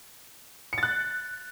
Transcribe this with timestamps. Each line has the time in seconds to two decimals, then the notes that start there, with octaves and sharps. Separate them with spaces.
0.73 C#7
0.78 A6
0.83 F#6